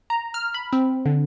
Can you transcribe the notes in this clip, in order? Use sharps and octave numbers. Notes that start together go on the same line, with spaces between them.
A#5
F6
B5
C4
D3